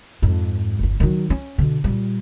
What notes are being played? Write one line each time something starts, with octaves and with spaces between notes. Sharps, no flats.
F2 G#2
G1 E2
D#3 F#3
C#4
B2 D3
A#2 G3